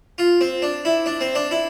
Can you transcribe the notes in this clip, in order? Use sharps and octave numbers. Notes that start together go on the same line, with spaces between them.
F4
C4
D4
E4
D4
C4
D4
E4